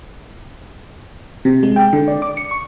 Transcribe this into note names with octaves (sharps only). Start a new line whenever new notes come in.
C3
G#3
G5
D3
D5
D6
C#7
C#6